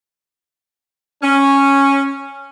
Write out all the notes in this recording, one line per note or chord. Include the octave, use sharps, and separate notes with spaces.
C#4